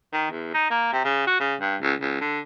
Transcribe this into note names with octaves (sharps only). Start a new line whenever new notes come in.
D#3
E2
D#4
A#3
C3
C#3
F#4
C#3
G2
C#2
C#2
D3